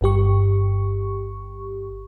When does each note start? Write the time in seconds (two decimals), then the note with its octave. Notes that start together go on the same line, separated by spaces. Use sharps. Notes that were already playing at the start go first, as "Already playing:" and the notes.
0.01 G1 G2 G4 C#6